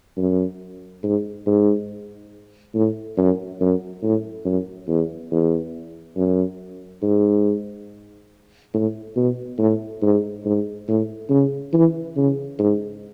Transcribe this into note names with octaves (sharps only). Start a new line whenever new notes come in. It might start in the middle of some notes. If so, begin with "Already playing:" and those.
F#2
G#2
G#2
A2
F#2
F#2
A2
F#2
E2
E2
F#2
G#2
A2
B2
A2
G#2
G#2
A2
C#3
E3
C#3
G#2